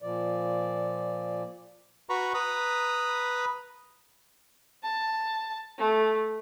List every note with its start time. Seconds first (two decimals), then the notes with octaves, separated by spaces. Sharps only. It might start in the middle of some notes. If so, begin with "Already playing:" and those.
0.02 A#2 F3 D5
2.09 F#4 B4 A#5 B5 C#6
2.34 B4 A#5 B5 D#6
4.83 A5
5.78 A3